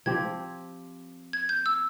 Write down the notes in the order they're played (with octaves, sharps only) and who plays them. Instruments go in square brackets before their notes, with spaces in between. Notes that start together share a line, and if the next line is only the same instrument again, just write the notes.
[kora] F3 C4 G4 [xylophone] G#6
[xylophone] G#6
G6
E6